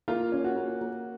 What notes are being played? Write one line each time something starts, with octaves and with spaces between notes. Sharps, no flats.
A#3 F4
C#4
F#4
A#3
A#3